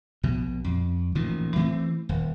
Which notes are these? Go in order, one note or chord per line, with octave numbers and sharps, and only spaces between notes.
A#1 B2
F2
A1 A#2 D#3 F3
E3 A3 A#3 C4
D#1